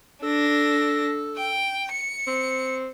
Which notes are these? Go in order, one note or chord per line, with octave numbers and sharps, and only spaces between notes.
D4 A4 A#6
G5
C#7
C4